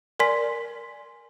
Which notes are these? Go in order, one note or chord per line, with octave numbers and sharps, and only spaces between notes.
A#4 D5 G#5 C6 B6